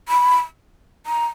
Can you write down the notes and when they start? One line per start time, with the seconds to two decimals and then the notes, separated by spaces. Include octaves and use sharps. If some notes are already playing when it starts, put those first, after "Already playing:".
0.09 B5
1.06 A#5